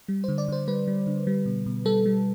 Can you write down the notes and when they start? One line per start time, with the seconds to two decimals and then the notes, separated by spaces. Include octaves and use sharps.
0.08 G3
0.24 D3 C5
0.38 D5
0.48 D3 C5
0.67 G3 B4
0.87 G3
1.07 D3
1.27 G3
1.46 B2
1.66 B2
1.85 G3 A4
2.06 G3